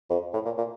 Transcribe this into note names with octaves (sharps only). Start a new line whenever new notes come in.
F2
A2
A#2
A#2